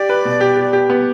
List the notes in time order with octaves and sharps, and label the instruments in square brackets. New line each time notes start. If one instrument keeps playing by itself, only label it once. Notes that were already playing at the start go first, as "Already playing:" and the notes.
Already playing: [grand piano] G4 [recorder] D5
[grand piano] B4
B2
G4
G4
G4
B3